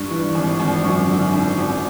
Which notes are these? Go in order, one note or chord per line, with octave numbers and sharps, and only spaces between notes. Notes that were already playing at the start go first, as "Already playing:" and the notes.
Already playing: G2 C#6
E3
G#1
G#1
F#2 C#6
D3
G#1
G#1